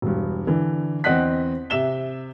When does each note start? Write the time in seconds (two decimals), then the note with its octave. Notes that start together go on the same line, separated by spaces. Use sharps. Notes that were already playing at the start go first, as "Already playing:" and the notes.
0.02 E1 G2
0.47 D3 E3
1.04 E2 C4 D#5 F#5 F#6 B6
1.70 C3 E5 E7 G7